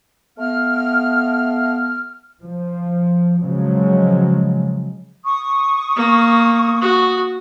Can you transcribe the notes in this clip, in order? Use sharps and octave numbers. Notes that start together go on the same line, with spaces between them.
A3 B3 F5 F6
F3
C#3 F3 F#3 G#3
C#6 D#6
A#3
F#4